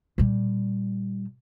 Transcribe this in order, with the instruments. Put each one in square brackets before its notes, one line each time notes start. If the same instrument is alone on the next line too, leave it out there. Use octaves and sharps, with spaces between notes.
[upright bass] A#2 G3